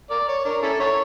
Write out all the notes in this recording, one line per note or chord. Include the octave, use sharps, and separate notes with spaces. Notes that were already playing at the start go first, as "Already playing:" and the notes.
A#4 D5
C#5
D4 A#4
C#4 E4 A4
E4 A#4 C#5